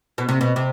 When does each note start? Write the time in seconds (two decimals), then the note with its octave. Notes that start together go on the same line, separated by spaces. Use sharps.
0.18 B2
0.29 C3
0.41 B2
0.56 C3